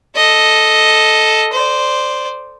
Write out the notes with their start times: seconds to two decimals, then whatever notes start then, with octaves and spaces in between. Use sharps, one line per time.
0.16 A4 D#5
1.52 C5 D5